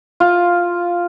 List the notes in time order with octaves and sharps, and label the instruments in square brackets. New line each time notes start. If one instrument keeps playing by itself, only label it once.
[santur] F4